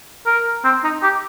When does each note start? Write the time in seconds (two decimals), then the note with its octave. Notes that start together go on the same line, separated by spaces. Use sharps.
0.26 A#4
0.64 C4
0.84 D#4
1.03 G4